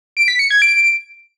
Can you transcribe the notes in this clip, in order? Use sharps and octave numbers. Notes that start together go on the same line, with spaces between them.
D7
B6
C#7
G#6
D7